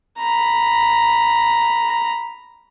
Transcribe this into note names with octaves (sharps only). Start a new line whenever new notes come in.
A#5 B5